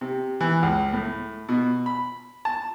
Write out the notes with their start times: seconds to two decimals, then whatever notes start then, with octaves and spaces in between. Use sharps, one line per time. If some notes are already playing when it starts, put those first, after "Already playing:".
0.01 C3
0.41 E3
0.63 C#2
0.93 A2
1.49 B2
1.86 B5
2.45 A5